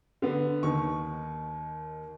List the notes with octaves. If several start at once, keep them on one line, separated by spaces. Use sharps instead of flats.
D3 B3
D#2 D#3 C#6